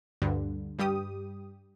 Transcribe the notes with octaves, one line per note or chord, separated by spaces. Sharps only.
D2 G2 D3
G2 G3 G4 D#6